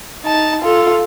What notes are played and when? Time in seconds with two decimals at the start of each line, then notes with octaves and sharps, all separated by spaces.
0.24 D#4 A5
0.62 F4 A4